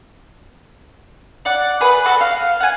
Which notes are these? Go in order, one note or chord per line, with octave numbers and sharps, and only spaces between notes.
D5 F#5
G#4 B4
F#4 A4 F#5
F5
F#5 G#5